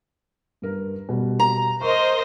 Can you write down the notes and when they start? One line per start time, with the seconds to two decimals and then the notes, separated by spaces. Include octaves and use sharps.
0.62 G2 A#4
1.09 B2 G3
1.40 A#5
1.81 A#4 C5 D#5 C#6